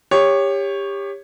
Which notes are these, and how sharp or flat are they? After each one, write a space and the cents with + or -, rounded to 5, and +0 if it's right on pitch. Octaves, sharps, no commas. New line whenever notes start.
G4 +25 C#5 +0